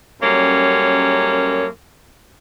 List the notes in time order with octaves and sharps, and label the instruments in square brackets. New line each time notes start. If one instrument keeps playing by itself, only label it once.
[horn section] F#2 G3 A#3 C#4 A4